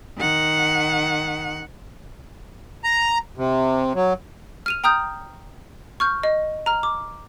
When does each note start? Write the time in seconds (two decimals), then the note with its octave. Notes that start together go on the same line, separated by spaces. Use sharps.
0.18 D#3 F#5
2.84 A#5
3.38 C3
3.95 F#3
4.66 F6 D#7 F7
4.84 G5 A#5 D#6 F6 G6
6.00 C#6 F6 G6
6.23 D#5
6.66 A#5 F6
6.83 D6